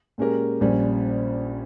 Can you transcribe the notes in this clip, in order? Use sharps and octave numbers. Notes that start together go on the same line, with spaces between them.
A#2 G#3 C#4 G4 A#4
A#1 A#2 G3 C#4